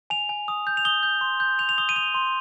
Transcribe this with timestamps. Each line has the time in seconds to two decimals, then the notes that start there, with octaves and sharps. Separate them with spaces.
0.10 G#5 F7
0.29 G#5
0.48 D#6
0.67 G6
0.77 F7
0.85 D#6 G7
1.03 G6
1.21 C6
1.40 G6
1.59 G6 F7
1.69 F7
1.78 D#6 G7
1.89 D#7
1.96 D#6 F7
2.14 C6